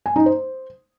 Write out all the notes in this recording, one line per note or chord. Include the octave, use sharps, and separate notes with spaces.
G#5
D#4
C5